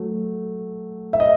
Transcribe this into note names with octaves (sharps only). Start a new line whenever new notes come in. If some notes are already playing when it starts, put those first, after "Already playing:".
Already playing: F#3 A3
E5
D#5